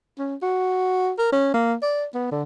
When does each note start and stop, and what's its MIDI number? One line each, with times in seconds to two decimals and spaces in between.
0.19 0.35 61
0.42 1.11 66
1.18 1.31 70
1.32 1.52 61
1.54 1.75 58
1.82 2.05 74
2.14 2.30 59
2.31 2.43 50